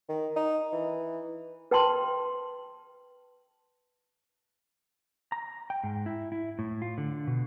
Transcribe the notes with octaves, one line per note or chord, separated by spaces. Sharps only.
D#3
D#4
E3
B4 G5 A5 C6
A#5
G5
G#2
E4
E4
A2
F4
D3
B2